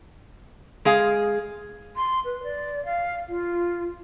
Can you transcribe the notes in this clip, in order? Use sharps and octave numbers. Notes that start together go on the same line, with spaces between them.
G#3 G#4 F5
C6
B4
D5
F5
F4